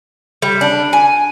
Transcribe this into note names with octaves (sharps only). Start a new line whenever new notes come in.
G3
D4
G#5